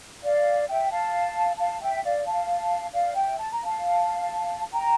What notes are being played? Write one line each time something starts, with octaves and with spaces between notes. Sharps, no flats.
D5 F5
E5 G5
F5 A5
F5 A5
E5 G5
D5 F5
F5 A5
D5 F5
E5 G5
A5
A#5
F5 A5
G5 A#5